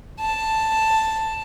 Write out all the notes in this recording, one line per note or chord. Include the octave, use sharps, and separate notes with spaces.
A5